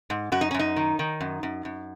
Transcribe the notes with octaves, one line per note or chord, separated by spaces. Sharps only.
G#2
F#2 F#4
D#4
C#4
F#2
D#4
D#3
D#3
F#2
F#2
F#2